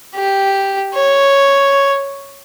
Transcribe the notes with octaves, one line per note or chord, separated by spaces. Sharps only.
G4
C#5